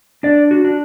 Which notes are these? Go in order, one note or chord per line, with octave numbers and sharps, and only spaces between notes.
D4 D5
F#4
D4